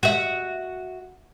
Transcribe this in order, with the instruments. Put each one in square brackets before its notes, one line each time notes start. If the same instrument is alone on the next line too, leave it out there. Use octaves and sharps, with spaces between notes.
[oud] F#4 E5